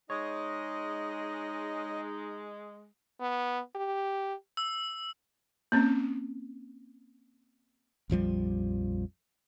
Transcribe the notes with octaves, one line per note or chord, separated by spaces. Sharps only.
G#3 D#4 C#5 D#5
B3
G4
E6
A#3 C4 C#4
A#1 F2 F3 G3